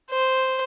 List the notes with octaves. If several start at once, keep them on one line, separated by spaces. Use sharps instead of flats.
C5